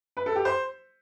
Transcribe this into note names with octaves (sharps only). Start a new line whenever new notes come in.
B4
A4
G4
C5